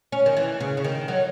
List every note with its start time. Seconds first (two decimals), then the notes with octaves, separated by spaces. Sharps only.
0.12 C#4
0.26 D#3
0.37 E3
0.60 C#3
0.77 C#3
0.84 D#3
1.08 F#3